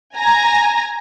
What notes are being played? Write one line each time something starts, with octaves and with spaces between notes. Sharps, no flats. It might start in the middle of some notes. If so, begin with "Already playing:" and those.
G#5 A#5